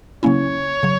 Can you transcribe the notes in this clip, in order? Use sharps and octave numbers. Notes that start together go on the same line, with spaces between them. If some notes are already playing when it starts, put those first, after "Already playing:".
C#3 F#3 A#3 C#4 E4 C#5
C#3 F#3